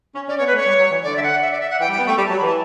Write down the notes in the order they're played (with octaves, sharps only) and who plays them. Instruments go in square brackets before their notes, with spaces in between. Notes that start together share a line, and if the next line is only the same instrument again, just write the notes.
[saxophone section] C#4
[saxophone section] C#4 [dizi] D5
[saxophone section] B3 [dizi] C#5
[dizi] B4
[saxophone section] A3
[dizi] C#5
[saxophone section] G3
F#3
E3
[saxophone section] D3 [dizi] D5
[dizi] E5
F#5
E5
D5
E5
F#5
[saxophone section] E3 [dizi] G5
[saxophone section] G3
[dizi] G5
[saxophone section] B3
[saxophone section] A3 [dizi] G5
[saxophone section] G3
[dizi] A5
[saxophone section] F#3
[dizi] B5
[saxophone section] E3 [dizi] A5